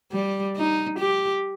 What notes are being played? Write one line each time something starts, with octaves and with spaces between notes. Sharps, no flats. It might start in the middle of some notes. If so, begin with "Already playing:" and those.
G3
D#4
G4